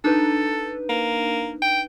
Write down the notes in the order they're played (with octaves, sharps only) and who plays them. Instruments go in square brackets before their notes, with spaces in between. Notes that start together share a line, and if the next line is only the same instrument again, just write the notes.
[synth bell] D4 D#4 B4 [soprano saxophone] A4
[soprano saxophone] A#3
G5